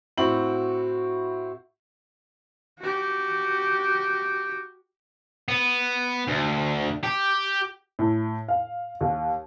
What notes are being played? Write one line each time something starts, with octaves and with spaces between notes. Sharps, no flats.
A2 C4 E4 F#4 F#7
F#4 G4
B3
D2
G4
A2
F5
D#2